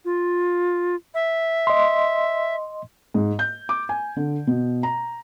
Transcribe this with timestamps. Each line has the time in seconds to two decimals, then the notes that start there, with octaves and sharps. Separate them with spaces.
0.05 F4
1.15 E5
1.67 D#5 C6
3.14 G#2
3.39 G6
3.69 D6
3.89 G#5
4.16 D3
4.47 B2
4.83 A#5